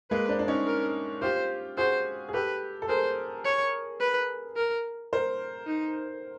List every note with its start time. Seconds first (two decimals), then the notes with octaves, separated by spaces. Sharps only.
0.11 G#3 A#3 B4
0.29 C4 D4
0.39 D4
0.48 C#4 D#4
0.67 A#4
1.22 F4 G4 C5
1.77 F#4 G#4 C5
2.29 G#4
2.34 G4 A4 B4
2.82 A4
2.89 G#4 A#4 C5
3.45 C#5
4.00 B4
4.57 A#4
5.13 A#4 C5
5.67 D#4